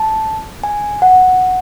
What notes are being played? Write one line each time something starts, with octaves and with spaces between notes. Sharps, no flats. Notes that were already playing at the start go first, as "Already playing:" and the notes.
Already playing: A5
G#5
F#5